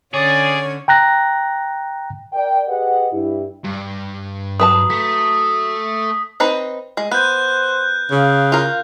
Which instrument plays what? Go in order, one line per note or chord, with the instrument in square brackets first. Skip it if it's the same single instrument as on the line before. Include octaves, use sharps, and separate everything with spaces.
[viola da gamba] D3 C#4 [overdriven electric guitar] G#4 [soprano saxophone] C#5 [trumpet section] D5
[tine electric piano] G5 A#5 F#6 A#6
[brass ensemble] A#4 D5 G5
G4 G#4 B4 D#5 F#5
G2 E4 G4
[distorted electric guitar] G2
[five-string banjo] F#3 B4 A5 [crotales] D#6
[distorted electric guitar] A3 [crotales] B6
[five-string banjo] C4 D#4 B4
G#3
[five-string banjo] B3 [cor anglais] C5 [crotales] F#6 G6
[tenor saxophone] C#3 [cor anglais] F5
[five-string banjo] F4 A#4